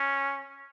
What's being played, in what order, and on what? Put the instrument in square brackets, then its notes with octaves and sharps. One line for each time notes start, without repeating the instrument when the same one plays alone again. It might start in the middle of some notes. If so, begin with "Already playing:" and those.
Already playing: [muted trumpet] C#4